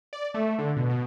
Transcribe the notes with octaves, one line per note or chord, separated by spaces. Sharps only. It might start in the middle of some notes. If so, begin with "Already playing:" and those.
D5
A3
D3
B2
B2